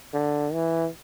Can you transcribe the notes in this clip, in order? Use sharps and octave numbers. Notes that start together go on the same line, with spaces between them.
D3
E3